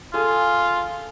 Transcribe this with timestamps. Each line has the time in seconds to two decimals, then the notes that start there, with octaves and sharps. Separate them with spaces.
0.14 F4 G#4 A4 G#5